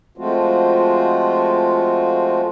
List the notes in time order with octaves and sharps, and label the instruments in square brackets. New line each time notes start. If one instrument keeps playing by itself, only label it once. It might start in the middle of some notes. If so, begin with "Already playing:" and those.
[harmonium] F3 G#3 A3 C4 F4 F#4